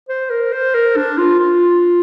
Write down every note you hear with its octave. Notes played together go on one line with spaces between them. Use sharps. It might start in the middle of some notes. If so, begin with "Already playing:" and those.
C5
A#4
C5
A#4
D4
F4
F4